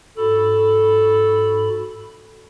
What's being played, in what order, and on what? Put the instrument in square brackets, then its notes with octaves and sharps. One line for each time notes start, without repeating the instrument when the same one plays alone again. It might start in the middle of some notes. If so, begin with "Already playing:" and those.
[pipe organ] G#2 F#4 B5 [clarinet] A4